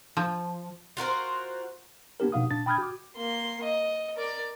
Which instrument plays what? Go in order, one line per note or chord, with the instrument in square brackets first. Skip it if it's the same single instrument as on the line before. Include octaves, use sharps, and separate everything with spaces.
[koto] F3
[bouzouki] F4 F#4 A#4 C5
[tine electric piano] A#3 B3 D4 G4 A#4
B2 F3 D#4 F5 F#5 D#6
A#2 D4 A6
G5 B5 D#6 F6 G6 G#6
F#4 D6
[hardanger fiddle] A#3 C6
D#5
A#4 D5